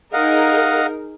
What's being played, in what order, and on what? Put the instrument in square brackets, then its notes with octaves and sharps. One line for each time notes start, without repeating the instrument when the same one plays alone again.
[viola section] D#4 G#4 A#4 [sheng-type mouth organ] D#5 F5 F#5